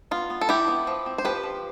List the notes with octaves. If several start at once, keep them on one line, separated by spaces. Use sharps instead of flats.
B3 F4
B3
A4
E3 E4 G4
B3
F3
C4
C5
F3 G4 B4
F3